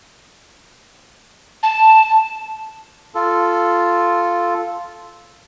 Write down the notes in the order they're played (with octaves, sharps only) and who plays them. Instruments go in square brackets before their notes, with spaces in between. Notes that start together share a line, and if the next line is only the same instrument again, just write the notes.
[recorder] A5
[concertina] F4 A4